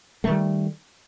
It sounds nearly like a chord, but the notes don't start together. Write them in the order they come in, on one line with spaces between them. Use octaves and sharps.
A3 D#3 G3